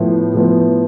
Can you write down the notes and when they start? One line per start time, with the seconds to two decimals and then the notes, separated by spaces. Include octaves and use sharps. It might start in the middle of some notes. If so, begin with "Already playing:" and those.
Already playing: A2 F3 B3
0.34 A2 F3 B3